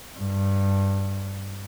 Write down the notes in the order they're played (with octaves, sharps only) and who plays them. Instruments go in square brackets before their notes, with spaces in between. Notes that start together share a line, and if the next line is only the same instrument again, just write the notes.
[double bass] G2